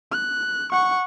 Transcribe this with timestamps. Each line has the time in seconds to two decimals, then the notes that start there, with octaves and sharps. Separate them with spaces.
0.11 F#6
0.72 F#5 C#6